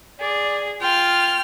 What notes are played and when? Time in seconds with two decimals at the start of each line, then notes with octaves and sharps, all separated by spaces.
0.20 G#4 D5
0.82 F4 G5 F6